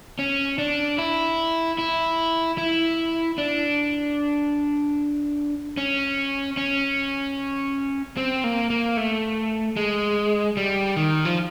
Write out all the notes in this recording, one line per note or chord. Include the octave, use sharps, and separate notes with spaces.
C#4
D4
E4
E4
E4
D4
C#4
C#4
C4
A#3
A#3
A3
G#3
G3
D#3
F3